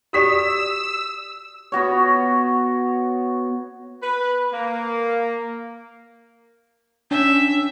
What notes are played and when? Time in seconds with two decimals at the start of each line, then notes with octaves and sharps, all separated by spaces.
0.13 F#4 G4 D5 D#6 E6 B6 E7
1.72 B3 F#4 C#5
4.03 B4
4.53 A#3
7.11 C#4 D4 E5 G5